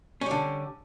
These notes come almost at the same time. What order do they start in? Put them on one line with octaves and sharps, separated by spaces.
C#4 G3 D3